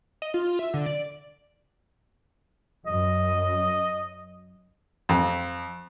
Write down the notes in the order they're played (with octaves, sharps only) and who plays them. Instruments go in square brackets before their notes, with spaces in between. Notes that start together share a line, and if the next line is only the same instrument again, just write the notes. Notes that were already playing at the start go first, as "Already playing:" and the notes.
[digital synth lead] D#5
F4
E5
D3
D5
[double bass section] F#2 [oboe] D#5
[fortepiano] F2